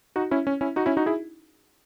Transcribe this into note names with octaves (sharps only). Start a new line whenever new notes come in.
D#4 F#4
C#4 E4
C#4
C#4 E4
D#4 F#4
C#4 E4
D#4 F#4
E4 G#4